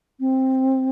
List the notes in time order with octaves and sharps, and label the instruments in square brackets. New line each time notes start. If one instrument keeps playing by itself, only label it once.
[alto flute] C4